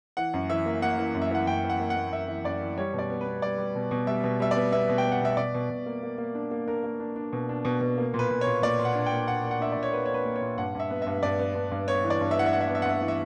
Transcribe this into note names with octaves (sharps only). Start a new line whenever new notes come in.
E3 F#5
F#2
E3 E5
A#3
A#3 F#5
E3
F#2
E5
E3 F#5
F#2 G5
E3
F#5
A#3
F#5
A#3
F#2 E5
E3
F#2 D5
E3
G3 C#5
B2
D5
B3
B3 B4
G3 D5
G3
B2
B2
G3 E5
B2
G3 E5
D5
B3
B3 E5
B2
G5
B3
F#5
B2 E5
B2 D5
B2
B2
A#3
A#3
A#3
D4
A#3
D4 A#4
A#3
D4
D4
B2
D4
B2
B2
A#3
A#2
B4
A#2
C#5
A#2
A#2 D5
A#2
F#5
D4
G5
A#3
D4 F#5
A#3
F#5
D4 E5
A#2 D5
C#5
A#3 B4
C#5
D4 B4
A#3
C#5
A#2
G2 F#5
G2 E5
B3
G2 E5
G2 D5
B3
G2
G2
B3 C#5
E3
D5
G2
E5
E3 F#5
E5
E3 F#5
E5
B3 F#5
E5
F#5
G2 E5
E3
E5